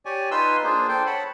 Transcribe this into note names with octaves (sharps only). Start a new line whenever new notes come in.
G4 C#5 D5 G#5
D#4 F4 B4 G#5 C6 E6
A#3 D4 F4 G#4 C5
A4 C5 G5
C#5 F#5 A5 B5